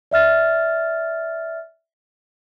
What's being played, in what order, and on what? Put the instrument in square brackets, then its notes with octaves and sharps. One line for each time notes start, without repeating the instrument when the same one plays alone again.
[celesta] D5 E5 F6 A6